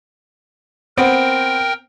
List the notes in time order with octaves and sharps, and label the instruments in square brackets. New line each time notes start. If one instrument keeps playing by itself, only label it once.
[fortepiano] B3 C4 [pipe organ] A#4 G5